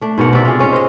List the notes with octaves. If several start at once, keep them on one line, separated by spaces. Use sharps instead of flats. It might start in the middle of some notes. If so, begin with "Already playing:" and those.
A3 D4
G#2 B2 A#4 F#5
C3 F#4 D5 E5
F4 G#4
G#3 C#4
C5 D#5